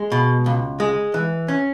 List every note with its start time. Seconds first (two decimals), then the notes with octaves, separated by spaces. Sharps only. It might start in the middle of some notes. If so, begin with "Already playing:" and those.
Already playing: G#3
0.12 B2
0.46 C#2
0.80 G#3
1.14 E3
1.48 C#4